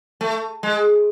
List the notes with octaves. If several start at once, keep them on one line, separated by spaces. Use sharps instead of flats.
A3
G#3